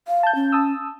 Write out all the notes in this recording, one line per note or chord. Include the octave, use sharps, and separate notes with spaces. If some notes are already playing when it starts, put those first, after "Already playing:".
F5
A5 G6
C#4
A5 D#6 E6